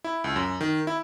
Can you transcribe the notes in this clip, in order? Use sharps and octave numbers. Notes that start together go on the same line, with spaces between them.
E4
C#2
F#2
D#3
E4